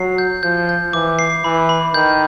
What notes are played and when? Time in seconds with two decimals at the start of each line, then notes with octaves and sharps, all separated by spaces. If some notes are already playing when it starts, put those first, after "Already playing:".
Already playing: F#3 C7
0.18 G6
0.43 F3 G6
0.69 G6
0.93 E3 D6
1.19 C7
1.44 E3 B5
1.69 B5
1.94 D#3 G6